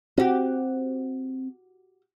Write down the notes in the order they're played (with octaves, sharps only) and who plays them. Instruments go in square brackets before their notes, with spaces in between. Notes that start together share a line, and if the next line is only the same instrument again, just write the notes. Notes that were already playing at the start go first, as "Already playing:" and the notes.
[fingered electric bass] C4 [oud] F#4 G4